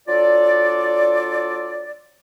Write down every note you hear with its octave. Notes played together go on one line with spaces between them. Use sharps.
F#3 D4 F4 A4 D5